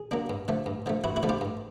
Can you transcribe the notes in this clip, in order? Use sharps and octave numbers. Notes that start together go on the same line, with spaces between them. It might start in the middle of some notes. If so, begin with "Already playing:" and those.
Already playing: G#4
F#3 A#3 D4
G2
D3 F3 A3
G2
D3 F3 A3
G2 E4 F#4
E4 F#4
D3 F3 A3
F4 G4
G2